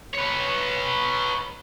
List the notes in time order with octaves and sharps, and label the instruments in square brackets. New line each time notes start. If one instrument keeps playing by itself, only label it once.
[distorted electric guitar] B4 C#5